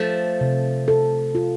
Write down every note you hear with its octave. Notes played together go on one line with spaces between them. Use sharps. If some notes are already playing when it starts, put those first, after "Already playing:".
Already playing: F3 A3 A4
C3
A4
F4